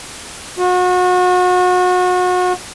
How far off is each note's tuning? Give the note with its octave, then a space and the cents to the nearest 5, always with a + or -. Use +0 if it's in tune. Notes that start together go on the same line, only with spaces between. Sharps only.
F#4 -35